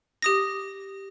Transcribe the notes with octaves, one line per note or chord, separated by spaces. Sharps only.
G4 D#6 A#6